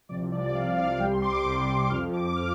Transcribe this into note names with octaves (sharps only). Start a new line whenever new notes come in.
C2 C3 F3 D5
D5
C2 C3 F3 F5
F5
C2 C3 G3 G5
C6
D6
C2 C3 G3
F2 F3 F6
D6
D6
F3 F6